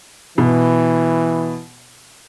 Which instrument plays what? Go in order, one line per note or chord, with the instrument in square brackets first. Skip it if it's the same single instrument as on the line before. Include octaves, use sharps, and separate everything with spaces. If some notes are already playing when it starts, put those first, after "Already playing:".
[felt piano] B2 [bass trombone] E3